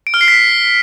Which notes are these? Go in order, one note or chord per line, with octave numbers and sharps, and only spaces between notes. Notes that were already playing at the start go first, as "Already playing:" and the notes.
D7
F6
C7
B6